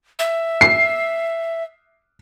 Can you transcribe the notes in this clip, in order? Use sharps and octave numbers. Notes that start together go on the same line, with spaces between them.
E5
C7